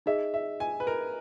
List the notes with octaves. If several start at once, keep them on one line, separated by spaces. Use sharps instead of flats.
D#4 G#4 D#5 E5
E5
G#5
B4
A#4